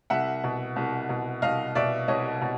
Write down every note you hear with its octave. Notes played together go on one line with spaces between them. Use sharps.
C2 E5 F#5
B2
C2
B2
C2 D#5 F5
B2 D5 E5
C2 C#5 D#5
B2